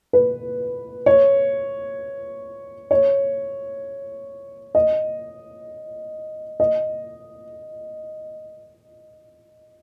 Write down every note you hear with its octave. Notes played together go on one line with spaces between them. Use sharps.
B4
C#5
C#5
D#5
D#5